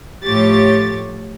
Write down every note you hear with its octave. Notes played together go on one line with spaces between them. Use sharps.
A2 F3 G4 C#5 A6